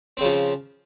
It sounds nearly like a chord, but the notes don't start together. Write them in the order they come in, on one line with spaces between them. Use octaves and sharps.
C4 C#3 F3